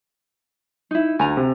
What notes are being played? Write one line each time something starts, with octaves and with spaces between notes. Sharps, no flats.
D#4 E4
D2 G#5 A#5
C3